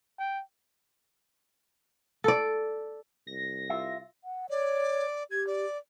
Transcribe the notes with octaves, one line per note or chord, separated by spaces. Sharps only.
G5
A4 D5
C2 A#6
F4 E5
F#5
C#5 D5
G4 G#6
D5